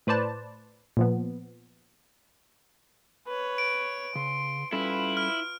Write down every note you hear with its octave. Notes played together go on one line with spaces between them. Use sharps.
A2 B4 C5 D5 A5
A#2 F3 B3
B4 C#5
D7
C#3 C6
G3 C#4 E4 F4 A4 B4
F6